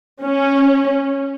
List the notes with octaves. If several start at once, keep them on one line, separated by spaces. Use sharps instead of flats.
C#4